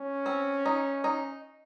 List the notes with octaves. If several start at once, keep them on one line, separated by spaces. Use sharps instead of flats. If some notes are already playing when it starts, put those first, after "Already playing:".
Already playing: C#4
C4
D#4
D#4